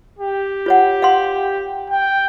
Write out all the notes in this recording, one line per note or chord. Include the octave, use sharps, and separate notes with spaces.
G4
F4 C#5 F#5
F5 F#5 C6
G5